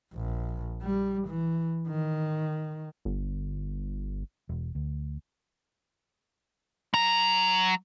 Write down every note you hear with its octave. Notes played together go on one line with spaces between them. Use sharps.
A#1
G3
E3
D#3
G1
E1
D2
F#3 A#5